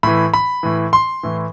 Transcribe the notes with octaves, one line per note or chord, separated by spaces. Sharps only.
A2 E3 B5
B5
A2 E3
C6
A2 E3